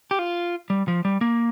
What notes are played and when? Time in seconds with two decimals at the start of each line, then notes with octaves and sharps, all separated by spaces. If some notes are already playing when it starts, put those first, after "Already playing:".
0.11 G4
0.19 F4
0.70 G3
0.88 F3
1.05 G3
1.21 A#3